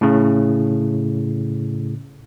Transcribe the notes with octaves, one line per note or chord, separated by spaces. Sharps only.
A2 C#3